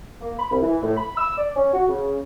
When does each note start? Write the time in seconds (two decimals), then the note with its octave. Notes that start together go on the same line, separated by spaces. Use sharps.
0.21 A#3
0.39 B5
0.51 C2
0.62 E3
0.83 A2
0.96 B5
1.17 E6
1.37 D5
1.56 C#4
1.73 F#4
1.89 C#3